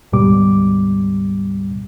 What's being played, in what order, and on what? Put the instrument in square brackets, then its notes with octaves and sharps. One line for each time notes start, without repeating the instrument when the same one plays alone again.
[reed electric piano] D2 G#2 B2 G3 D6